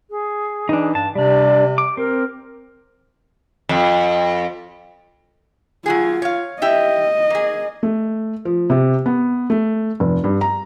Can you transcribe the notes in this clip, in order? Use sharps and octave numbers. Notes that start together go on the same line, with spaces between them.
G#4
E3 D4 D#4
G2 A5
C3 G3 D4 D5
D6
C4 A#4
F2
F#3 F4 F#4 G#4
C#5 F5
E4 G4 D#5 E5
A#3 G#4
A3
F3
C3
B3
A3
F1
G2
A#5